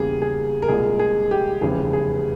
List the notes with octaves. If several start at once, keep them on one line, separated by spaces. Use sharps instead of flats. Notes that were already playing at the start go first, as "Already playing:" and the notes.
Already playing: E2 C#3 G3 A#3 G#4
G#4
A#4
C2 A#2 G#3 G#4
G#4
G4
F1 E2 C#3 E3 G3 G#4
G#4